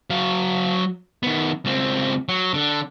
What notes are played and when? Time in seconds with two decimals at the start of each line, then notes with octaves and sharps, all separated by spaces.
0.10 F#3 F5
1.23 D#3 B3
1.65 C#2 C4
2.29 F#3
2.54 D3